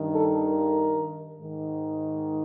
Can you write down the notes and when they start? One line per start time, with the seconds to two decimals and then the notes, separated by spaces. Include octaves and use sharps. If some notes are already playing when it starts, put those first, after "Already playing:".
Already playing: G2 D#3
0.14 A4
0.46 A#4
1.39 G#2 D#3